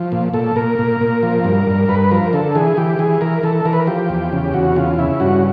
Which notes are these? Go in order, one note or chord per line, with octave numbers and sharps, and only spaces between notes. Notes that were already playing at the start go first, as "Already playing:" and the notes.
Already playing: F3
A#2
A#2 A4
A#2 A#4
A#2
A#2
F3
G2
G2
G2 B4
F3 A#4
D3 A4
E3 G#4
E3 G4
E3 G#4
E3 A#4
E3 A4
E3 A#4
B4
A#4
F3 G4
E2
C#3
E2 F#4
C#3 F4
C#3 E4
G2 F#4